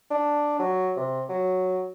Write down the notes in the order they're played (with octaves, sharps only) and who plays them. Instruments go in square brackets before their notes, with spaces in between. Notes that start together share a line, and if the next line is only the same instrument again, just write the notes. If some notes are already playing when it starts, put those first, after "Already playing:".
[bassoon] D4
F#3
C3
F#3